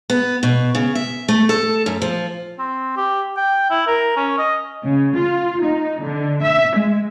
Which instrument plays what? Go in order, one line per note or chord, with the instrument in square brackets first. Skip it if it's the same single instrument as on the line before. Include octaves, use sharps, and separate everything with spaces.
[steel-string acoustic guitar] B3
B2
C#3
E5
A3
A4
F#2
F3
[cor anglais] C4
G4
G5
E4
A#4
C#4
D#5
[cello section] C#3
F4
D#4
D3
E5
G#3